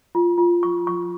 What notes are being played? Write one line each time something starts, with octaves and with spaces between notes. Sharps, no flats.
F4
F4
C#6
C#6